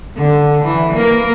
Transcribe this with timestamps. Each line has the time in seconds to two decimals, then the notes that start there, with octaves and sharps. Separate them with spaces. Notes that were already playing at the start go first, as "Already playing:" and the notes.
0.16 D3
0.64 E3
0.94 A#3 A#4